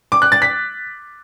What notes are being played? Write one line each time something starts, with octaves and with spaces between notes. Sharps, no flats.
D6
F#6
A6
B6